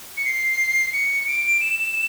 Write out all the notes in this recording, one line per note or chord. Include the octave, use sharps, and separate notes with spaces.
C#7
C7
C#7
D7
E7